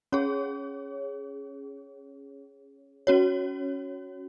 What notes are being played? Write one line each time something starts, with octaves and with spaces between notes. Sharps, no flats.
C#4 G#4 C#5
C#4 F#4 C#5